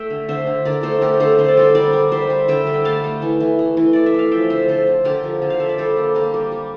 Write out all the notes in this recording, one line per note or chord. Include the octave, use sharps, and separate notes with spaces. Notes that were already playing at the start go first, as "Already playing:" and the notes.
Already playing: A3 E5 G5
D3
D3 C5 E5
D3
D3 A#4 D5
A3 A4 C5
A3 G4 A#4
D3 A4 C5
D3 C5
D5
G3 A4 C5
G3 A#4 D5
G3
G3 C5 E5
G3
D3 E5 G5
G3
G5
A3 F5 A5
A3
E3
E3
A3
E3
A3 D5
E5
E3 F5
F3 E5 G5
D3 C5 E5
D3 A4 C5
D3
D3 G4 A#4
F3
D3
F5
F3 E5
D5
G3 A4 C5
A#3
A#3 G4 A#4
G3
G3